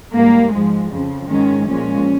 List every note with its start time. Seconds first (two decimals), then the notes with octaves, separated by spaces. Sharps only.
0.14 G#2 G3 A#3
0.52 G#2 F3 G#3
0.91 F2 C#3 F3
1.29 G#2 D#3 G#3 C#4
1.67 A#2 F3 G#3 C#4